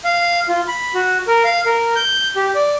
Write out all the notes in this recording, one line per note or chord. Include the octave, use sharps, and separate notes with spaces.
F5
F4
B5
F#4
A#4
F5
A#4
G6
G4
D5